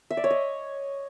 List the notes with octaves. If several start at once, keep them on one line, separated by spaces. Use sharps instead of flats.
E5
D5
C#5
D#5